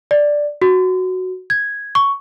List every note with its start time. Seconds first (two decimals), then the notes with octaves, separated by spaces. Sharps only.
0.11 D5
0.62 F#4
1.50 G#6
1.95 C#6